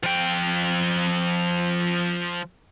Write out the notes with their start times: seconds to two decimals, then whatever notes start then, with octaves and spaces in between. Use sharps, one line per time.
0.03 F3 G5